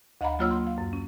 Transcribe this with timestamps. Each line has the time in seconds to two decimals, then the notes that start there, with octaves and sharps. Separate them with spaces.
0.21 D2 D#5 F5 F#5 A#5 B5
0.39 F#3 A#3 F4 C#5 E6 F6
0.51 C6
0.67 F5
0.78 F#2
0.93 C#4